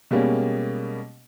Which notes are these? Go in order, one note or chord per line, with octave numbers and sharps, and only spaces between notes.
B2 G3 G#3 A#3 C#4